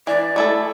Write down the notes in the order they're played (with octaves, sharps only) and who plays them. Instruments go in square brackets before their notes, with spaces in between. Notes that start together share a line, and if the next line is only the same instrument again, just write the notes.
[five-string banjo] E3 [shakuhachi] D5
[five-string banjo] A3 E4 A4